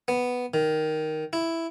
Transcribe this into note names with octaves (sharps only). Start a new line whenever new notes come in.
B3
D#3
E4